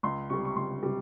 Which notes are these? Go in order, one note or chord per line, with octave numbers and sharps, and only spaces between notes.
C#2 C6
C3 G3 C#6
C#6
C#2 C6
C3 G3